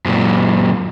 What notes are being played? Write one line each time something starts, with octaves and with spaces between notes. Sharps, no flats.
F#2 A#2